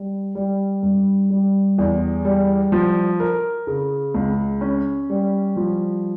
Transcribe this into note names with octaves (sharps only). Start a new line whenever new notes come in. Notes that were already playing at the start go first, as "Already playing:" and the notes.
Already playing: G3
G3
G2
G3
E2
G3
F3
A#4
C#3
C#2
C#4
G3
F3